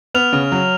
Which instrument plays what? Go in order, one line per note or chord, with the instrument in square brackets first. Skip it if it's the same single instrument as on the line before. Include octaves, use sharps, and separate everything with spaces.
[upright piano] B3 [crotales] F6 F7
[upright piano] C#3
F#3